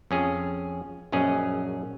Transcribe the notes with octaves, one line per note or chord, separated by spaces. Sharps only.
F2 C#4 G#4
A#1 F#2 C#4 G#4 D#5